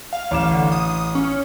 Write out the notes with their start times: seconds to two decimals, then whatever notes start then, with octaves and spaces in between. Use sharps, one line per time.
0.13 F5
0.31 A1 D6 E7
0.51 D3
0.72 D#6
1.15 C#4